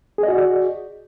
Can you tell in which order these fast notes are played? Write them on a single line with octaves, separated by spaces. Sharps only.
G#4 D#5 F#4 D5